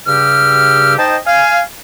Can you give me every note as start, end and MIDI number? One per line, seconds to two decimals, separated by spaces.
0.07 0.95 43
0.07 0.95 49
0.07 0.95 67
0.07 0.95 88
0.07 0.95 89
0.98 1.17 63
0.98 1.17 72
0.98 1.17 75
0.98 1.17 79
0.98 1.17 81
1.26 1.61 77
1.26 1.61 80